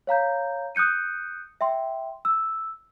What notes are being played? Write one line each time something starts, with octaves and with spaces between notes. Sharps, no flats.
C#5 F5 A#5 G6
D#6 F#6 G6 C#7 D#7
E5 G5 C6
E6